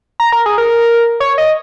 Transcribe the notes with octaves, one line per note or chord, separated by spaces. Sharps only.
A#5
A#4
G#4
A#4
C#5
D#5